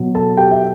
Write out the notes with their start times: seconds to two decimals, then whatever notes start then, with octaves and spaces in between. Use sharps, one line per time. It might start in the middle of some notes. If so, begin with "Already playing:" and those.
Already playing: B2 F#3
0.15 A4 A5
0.37 G4 G5
0.51 E5